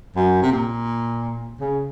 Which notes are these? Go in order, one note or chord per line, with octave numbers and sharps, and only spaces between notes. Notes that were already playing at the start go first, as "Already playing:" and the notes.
F#2
C3
A#2
C#3